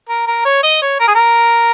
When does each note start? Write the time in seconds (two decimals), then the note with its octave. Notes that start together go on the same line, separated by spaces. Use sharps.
0.09 A#4
0.27 A#4
0.45 C#5
0.63 D#5
0.82 C#5
1.00 A#4
1.08 G#4
1.15 A#4